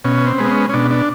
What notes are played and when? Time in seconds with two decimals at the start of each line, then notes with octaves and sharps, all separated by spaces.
0.05 B2 C#4
0.27 C4
0.38 G#3 B3
0.45 C4
0.50 C#4
0.69 C#4
0.74 B2 D4
0.91 D4